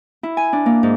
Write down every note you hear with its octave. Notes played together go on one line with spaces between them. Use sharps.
E4
G#5
D4
A#3
G#2